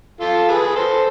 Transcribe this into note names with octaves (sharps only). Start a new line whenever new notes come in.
F4 A4
G#4 B4
A4 C5